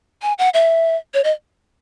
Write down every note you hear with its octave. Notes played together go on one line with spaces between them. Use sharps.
G#5
F#5
E5
C#5
D#5